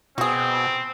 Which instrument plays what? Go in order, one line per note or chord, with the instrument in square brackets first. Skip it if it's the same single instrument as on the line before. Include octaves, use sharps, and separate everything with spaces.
[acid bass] B2 [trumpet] C4 [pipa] F#4 G#4